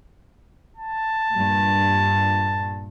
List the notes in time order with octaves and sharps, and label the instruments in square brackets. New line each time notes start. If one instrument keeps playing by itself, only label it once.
[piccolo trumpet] A5
[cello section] G2 A#2